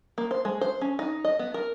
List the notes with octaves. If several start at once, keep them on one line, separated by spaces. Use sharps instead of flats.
A#3
C5
G#3
C5
C#4
D#4
D#5
B3
A#4